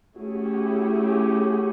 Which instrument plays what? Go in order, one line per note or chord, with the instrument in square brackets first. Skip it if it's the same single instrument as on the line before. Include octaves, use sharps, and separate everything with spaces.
[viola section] A3 C#4 E4 G#4 [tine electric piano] F#4
[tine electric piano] G4
F#4
G4
F#4
G4
F#4
G4
F#4
G4
F#4
G4
F#4